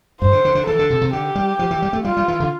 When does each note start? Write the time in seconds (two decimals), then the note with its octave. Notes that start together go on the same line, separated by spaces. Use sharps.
0.21 G2 C5
0.32 D3
0.45 D3
0.55 D3
0.67 E3 A4
0.79 D3
0.90 C3
1.01 C3
1.13 D3 G4
1.35 G3
1.59 F3
1.71 E3
1.82 G3
1.93 A3
2.04 G3 F4
2.17 G3
2.28 E3
2.40 D3